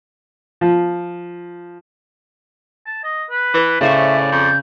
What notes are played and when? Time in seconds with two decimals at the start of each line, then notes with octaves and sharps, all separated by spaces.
0.61 F3
2.86 A5
3.04 D#5
3.30 B4
3.54 E3
3.81 A2 C#3 C5 D5 E5 C#6
4.32 F2 G6